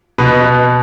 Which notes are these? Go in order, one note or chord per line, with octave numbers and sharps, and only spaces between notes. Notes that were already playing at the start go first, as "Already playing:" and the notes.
B2 B4
B2